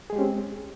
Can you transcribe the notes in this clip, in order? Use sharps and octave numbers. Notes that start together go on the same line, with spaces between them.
G#3 C4 C#4 G4 G#4